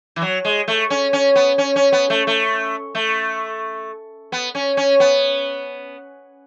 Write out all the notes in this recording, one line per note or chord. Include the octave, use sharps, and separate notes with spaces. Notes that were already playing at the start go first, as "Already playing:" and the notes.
E3
F#3
G#3
A3
C#4
C#4
B3
C#4
C#4
B3
A3
A3
A3
B3
C#4
C#4
B3